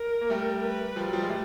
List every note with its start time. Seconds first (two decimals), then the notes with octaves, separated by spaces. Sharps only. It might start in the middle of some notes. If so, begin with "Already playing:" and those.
Already playing: A#4
0.21 A#3
0.30 G3 A3
0.63 B4
0.96 F3 G3
1.08 F#3
1.13 F3 G3
1.22 G#3
1.29 G3 A3